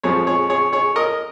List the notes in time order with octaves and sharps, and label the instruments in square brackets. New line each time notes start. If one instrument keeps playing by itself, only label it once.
[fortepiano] F2 F3 G#3 G#4 C#5
G#4 C#5
G#4 C#5
G#4 C#5
A#4 D#5